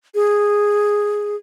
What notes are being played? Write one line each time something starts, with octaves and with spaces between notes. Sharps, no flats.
G#4